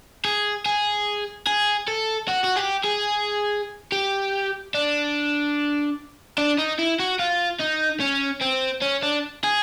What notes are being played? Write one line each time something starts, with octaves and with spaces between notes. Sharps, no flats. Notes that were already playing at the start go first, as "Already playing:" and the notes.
G#4
G#4
G#4
A4
F#4
F#4
G4
G#4
G4
D4
D4
D#4
E4
F#4
F4
D#4
C#4
C4
C#4
D4
G#4